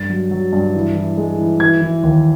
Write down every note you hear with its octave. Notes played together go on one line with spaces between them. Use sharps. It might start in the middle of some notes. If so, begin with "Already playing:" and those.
Already playing: G2 A6
F#3
F#3
G2
E3
E3
G#3
E3
E3 G#6
E3
D#2